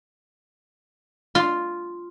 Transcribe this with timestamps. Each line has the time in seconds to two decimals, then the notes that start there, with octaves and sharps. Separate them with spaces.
1.35 F4